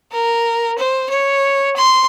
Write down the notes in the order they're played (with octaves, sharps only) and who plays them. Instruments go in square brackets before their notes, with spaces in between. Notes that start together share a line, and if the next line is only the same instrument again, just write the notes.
[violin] A#4
C5
C#5
C6